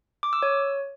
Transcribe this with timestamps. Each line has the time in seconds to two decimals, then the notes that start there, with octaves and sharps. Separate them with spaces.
0.23 D6
0.33 E6
0.43 C#5